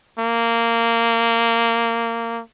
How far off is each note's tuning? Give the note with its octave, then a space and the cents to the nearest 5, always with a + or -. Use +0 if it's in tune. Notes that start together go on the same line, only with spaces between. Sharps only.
A#3 -15